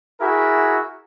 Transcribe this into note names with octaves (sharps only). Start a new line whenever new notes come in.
E4 F#4 G#4 A#4 E5